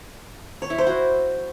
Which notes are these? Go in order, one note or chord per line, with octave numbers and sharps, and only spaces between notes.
C#5
E4
C5
F#4